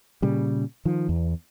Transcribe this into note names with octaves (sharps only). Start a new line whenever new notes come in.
A#2 C#3 G3
D#3 F3
E2